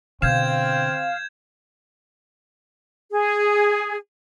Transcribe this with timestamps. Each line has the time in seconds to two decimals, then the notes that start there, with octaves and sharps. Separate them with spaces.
0.22 B2 D3 C4 F5 G6 G#6 E7
3.12 G#4